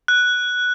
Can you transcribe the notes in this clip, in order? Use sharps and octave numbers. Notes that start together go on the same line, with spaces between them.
F#6